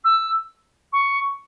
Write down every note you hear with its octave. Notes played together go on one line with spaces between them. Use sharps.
E6
C#6